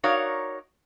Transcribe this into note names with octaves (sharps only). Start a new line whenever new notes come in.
D#4 F#4 A#4 C#5 D5 F5